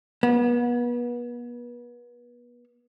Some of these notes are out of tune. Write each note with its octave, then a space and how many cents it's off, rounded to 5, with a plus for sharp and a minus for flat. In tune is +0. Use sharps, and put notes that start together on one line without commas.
B3 -35